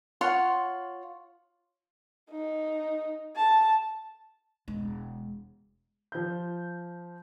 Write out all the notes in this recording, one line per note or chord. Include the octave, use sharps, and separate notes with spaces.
F4 C#5 F#5 C6
D#4
A5
E1 G#3
F3 G6